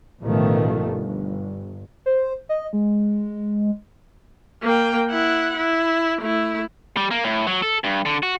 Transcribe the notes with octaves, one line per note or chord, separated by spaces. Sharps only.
A1 B2 D#3 F3 A3
G1
C5
D#5
G#3
A#3 G5
E4 F#5
E4
A3 E4
G3
A#3
A2
F#3
A4
G2
D3
F#4